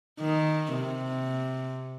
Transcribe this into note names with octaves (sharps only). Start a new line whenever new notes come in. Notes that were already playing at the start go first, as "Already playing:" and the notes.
D#3
C3